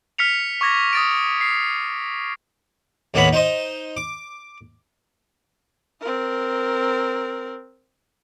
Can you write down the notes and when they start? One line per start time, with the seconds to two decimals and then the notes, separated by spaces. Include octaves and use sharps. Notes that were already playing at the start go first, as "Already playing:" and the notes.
0.18 F6 B6 C#7 F7
0.61 C#6 D6 G#6 A#6
0.93 D#6 A6 D7
1.41 C7
3.14 D#2 A2 A#3 B3 C#5 B5
3.33 D#4 C5 D#5
3.97 D6
6.01 C4 A#4